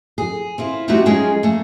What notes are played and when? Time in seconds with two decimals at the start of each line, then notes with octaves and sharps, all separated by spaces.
0.18 G#4
0.58 C4 E4 F4
0.88 G3 A3 C4 D#4 E4 F#4
1.06 F#3 G#3 C#4 F4 G#4 D#5
1.43 A3 A#3